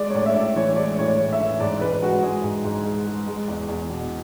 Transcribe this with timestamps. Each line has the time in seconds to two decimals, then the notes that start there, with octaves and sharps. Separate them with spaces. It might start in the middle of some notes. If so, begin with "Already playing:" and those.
Already playing: G#3 D5
0.10 C#5
0.14 A2 D5
0.26 E5
0.36 A2 D5
0.56 E3 C#5
0.76 G#3 D5
0.98 A2 C#5
1.05 D5
1.19 A2
1.32 E5
1.40 E3
1.60 G#2 D5
1.81 G#2 B4
2.02 G#3 F#4
2.23 G#3 G#4
2.43 G#2
2.64 G#2
2.85 G#3
3.06 G#3
3.27 G#3
3.48 E2
3.69 E2
3.90 B2